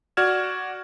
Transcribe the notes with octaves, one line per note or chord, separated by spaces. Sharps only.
F#4 D5 F6 G#6 E7